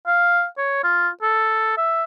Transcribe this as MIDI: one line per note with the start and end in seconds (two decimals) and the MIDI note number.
0.07 0.45 77
0.58 0.80 73
0.84 1.08 65
1.22 1.73 69
1.77 2.04 76